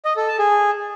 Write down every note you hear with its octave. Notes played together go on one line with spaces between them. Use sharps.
D#5
A4
A5
G#4